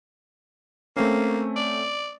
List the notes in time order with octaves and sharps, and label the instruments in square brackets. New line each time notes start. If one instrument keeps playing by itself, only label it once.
[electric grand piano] A3 C4 C#4 [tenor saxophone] A#3
[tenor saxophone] D5